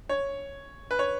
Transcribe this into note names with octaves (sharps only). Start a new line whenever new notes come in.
C#5
B4
C#5